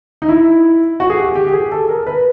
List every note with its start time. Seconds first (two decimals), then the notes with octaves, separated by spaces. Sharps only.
0.22 D#4
0.29 E4
1.00 F#4
1.10 G#4
1.18 G4
1.35 G4
1.47 G4
1.53 G#4
1.72 A4
1.89 A#4
2.07 B4